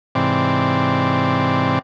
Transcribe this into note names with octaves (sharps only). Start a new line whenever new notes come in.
G#2 C3 E3 C4 D5